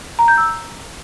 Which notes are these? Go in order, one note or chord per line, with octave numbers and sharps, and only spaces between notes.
A#5
G6
E6